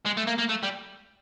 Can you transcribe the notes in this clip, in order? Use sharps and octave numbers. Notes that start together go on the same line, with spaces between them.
G#3
A3
A#3
A#3
A3
G3